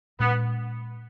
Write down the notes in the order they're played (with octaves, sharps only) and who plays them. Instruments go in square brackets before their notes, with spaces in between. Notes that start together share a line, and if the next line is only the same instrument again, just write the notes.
[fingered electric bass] A#2 G#3 C#4 [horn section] B3